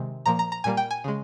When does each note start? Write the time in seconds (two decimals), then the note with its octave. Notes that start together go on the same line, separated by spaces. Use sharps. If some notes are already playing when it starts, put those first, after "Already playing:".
Already playing: C3 D#3 G#3
0.26 A#2 F3 A#3 A#5
0.39 A#5
0.52 A#5
0.64 A#2 G3 A#3 G#5
0.77 G5
0.91 G#5
1.04 C#3 G#3